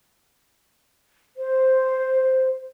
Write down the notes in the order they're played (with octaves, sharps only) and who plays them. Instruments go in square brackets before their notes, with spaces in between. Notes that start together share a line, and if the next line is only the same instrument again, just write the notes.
[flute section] C5